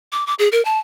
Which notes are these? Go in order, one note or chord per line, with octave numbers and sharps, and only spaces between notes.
D6
D6
G#4
A#4
A5